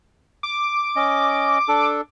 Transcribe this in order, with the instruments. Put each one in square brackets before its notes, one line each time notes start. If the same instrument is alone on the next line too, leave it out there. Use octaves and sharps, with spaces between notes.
[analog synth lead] D6
[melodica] C#4 D#5
D4 A4